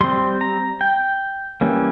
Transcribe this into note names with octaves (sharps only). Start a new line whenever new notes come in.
G3 C4 C6
A#5
G5
E3 G3 A#3 C#4